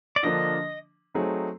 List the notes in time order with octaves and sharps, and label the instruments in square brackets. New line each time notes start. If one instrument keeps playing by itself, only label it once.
[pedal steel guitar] D5
[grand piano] D3 F3 A#3 D4 [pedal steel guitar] D#5
[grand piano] F#3 A3 C4 D#4 G#4